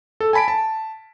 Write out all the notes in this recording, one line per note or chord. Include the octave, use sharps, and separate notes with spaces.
A4
G#5 A5 B5 B6 D7
A5